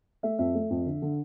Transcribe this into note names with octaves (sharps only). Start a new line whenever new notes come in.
A3 E5
F2 E5
A3
F2
D3
D3